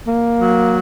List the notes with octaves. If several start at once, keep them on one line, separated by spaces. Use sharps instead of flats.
A#3
F#3